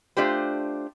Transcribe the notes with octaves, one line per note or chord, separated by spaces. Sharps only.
A3 D4 F4 G4 C5